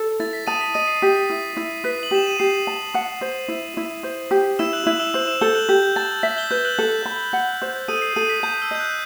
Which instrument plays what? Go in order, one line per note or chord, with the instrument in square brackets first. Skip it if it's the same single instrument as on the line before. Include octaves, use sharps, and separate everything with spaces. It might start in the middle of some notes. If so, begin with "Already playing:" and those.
Already playing: [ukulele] A4
[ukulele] E4 [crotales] A6
[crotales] B6
[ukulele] A5 [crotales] D#6 D#7
[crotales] B6
[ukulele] D#5 [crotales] D#6 D#7
[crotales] C7
[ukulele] G4 [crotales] B6
[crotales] B6
[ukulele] E4
E4
[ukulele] B4 [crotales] B6
[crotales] F#7
[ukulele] G4 [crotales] E7
[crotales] D#7
[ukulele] G4 [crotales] C7
[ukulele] A5
F#5
C5
E4
E4
C5
G4
[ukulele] E4 [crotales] E6 E7
[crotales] F#6 F#7
[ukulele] E4 [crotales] F#6 F#7
[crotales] E6 E7
[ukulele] C5 [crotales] F#6 F#7
[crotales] E6 E7
[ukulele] A4 [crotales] G6 G7
[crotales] F#6 F#7
[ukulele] G4 [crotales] G6
[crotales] G6
[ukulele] A5 [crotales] A6
[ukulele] E5 [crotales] B6
[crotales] G6 G7
[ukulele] B4 [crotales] G6 G7
[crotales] F#6 F#7
[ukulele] A4
B5
F#5
C5
[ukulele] A4 [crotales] D#6 D#7
[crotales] C7
[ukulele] A4 [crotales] D#6 D#7
[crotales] B6
[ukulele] A5 [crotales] G6
[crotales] E6
[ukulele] D#5 [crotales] G6
[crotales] F#6